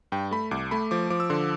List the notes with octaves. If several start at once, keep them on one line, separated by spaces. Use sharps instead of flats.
G2 G5
A3 B5
C2 D6
A3 B5
F3 D6
F3 D6
E6
D3 C6